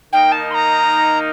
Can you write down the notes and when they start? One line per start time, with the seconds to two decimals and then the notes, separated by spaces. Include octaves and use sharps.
0.12 D#3 A#3 D#4 G5
0.32 A5
0.50 C6
0.54 A#5